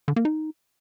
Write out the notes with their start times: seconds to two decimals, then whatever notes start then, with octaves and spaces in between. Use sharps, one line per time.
0.08 D3
0.16 A#3
0.25 D#4